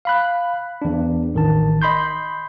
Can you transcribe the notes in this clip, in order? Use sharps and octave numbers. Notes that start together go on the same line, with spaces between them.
F5 B5 F#6
E2 D4
A1 D#3 A5
D#5 B5 C6 G6